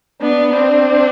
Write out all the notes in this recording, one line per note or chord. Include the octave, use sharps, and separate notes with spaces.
B3 D4
C4 D4